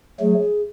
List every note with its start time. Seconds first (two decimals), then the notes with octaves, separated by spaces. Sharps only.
0.20 F#3 A3 G#4